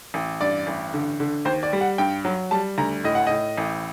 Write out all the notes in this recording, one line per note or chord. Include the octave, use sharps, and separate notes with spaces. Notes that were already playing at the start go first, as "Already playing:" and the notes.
A1
G2 D5
A1
D3
D3
D#2 C5
D5
G3
F#5
G2 G5
F#3
G3 A5
D2 A#5
A2 D#5
F#5
A2 D#5
A1